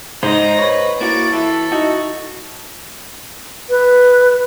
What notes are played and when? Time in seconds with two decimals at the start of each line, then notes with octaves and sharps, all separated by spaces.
0.23 G#2 D#4 C5 D#5 A#5 A#6
0.59 B4 C#5 B5
1.01 A#3 E4 F#4 D6 A6
1.33 E3 E4 A4
1.72 D#4 F#4
3.70 B4